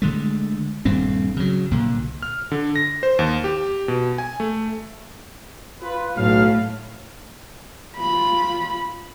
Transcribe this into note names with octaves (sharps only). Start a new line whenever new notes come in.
D3 G#3 A3
D#1 G2 C4
C#3 F#3
C2 A#2 D3
F6
D3
A#6
C5
D#2
G4
B2
G#5
A3
F4 B4
B1 A2 F#3 F5
F4 B5